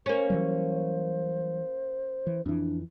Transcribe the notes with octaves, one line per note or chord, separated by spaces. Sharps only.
A#3 C#4 C5
E3 F#3 G3
E3
F2 E3 D4